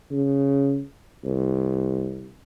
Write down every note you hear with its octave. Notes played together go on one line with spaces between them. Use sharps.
C#3
C2